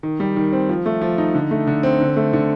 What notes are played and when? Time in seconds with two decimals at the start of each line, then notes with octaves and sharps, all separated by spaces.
0.03 D#3
0.20 G3
0.36 D#3
0.53 C4
0.69 F3
0.86 A3
1.02 F3
1.18 D#4
1.34 D3
1.51 A3
1.67 D3
1.83 C4
2.01 D3
2.16 A3
2.33 D3